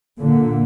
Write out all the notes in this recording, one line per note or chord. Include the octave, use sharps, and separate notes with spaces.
A#2 D3